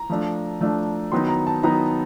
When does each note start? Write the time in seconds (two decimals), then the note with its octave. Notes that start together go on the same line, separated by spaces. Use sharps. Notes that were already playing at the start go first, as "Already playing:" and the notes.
Already playing: A#5
0.10 F3 A3 D4
0.60 F3 A3 D4
1.12 D#3 F#3 B3 D#4 C6
1.29 A#5
1.47 A5
1.63 D#3 F#3 B3 D#4 A#5